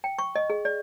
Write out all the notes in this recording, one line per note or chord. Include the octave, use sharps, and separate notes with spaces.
G5
C#6
D#5
G#4
D5